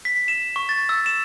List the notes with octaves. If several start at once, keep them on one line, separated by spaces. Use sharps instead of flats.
B6
E7
C#6
A6
E6
E7